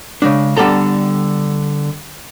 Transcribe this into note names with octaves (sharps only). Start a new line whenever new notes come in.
C#3 G#3 D4
D3 G3 B3 A4 A#5